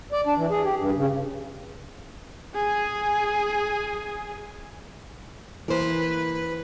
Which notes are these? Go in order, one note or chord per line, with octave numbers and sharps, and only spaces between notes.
D5
D4
E3
G#4
G4
G2
C#3
G#4 G#5
E3 A#3 B4 C5